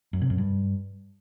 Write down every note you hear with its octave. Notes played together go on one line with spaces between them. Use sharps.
F#2
C3
F#2
G2